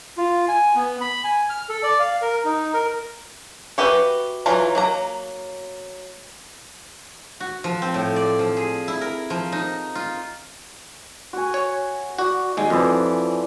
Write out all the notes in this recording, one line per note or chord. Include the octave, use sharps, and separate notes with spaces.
F4
G#5
B3
B5
G#5
F6
A4
D5
F5
A#4
D#4
A#4
F#4 G4 B4 E5
E3 F#3 F4 A#5
F#3 A#3 A#5
F#4
F3
C4
A2
D5
F3
G#4
E4
A#4
F3
D#4
F4
F#4 G#5
C#5
F#4 D5
D#2 G#3
F2 E3 F3 D5